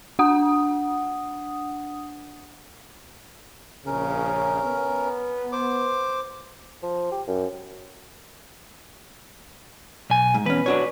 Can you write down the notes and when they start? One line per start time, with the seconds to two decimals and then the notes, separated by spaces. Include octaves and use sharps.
0.19 D4 F#5 D#6
3.86 A#1 C#3 C#4 A#4
4.64 B3
5.52 C5 D6
6.83 F3
7.12 G4
7.27 F#2
10.10 B1 G#5
10.34 G#2
10.46 E2 C#4 B4
10.66 D4 F#4 C#5